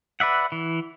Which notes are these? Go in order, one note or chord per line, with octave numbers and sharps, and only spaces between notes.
B4 D5 E5 F#5
E3